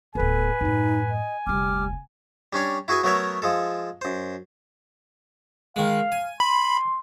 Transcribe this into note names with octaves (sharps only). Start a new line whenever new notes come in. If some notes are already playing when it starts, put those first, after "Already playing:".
D1 B3 A4 B4 G#5
F#2 A2 D#4
D#5
F1 D2 G3 D6 F6
G3 C#4 D4 C#5
E4 F#4 G#4 B4 G#5
F#3 A3 B3 A#4 C#5 E5
F3 G#3 A4
F#2 C5
D#3 G#3 F5
G#5
B5 C6